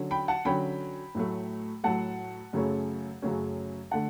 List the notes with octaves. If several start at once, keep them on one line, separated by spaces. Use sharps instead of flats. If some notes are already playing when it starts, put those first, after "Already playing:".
Already playing: D3 F#3 C#4
G5 B5
F#5 A5
D3 F#3 C#4 G5 B5
A2 F#3 A3
A2 F#3 A3 F#5 A5
F#2 C#3 F#3 A3 C#4
F#2 C#3 F#3 A3 C#4
D3 A3 F#5 A5